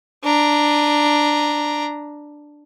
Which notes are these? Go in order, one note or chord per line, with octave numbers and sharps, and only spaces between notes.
D4 A#5